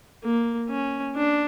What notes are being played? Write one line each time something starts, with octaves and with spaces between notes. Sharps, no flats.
A#3
C#4
D4